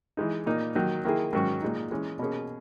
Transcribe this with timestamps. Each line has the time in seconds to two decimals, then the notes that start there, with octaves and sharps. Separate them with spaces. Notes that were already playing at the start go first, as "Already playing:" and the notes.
0.17 E3 G#3 D#4
0.46 A#2 A#3 D#4
0.75 D#3 F#3 A#3 D#4
1.05 D#3 A#3 E4 G#4
1.33 G#2 D#3 F#3 C#4 F#4
1.62 A#2 G#3 D#4
1.91 E3 G#3 C#4
2.19 B2 A#3 C#4 G#4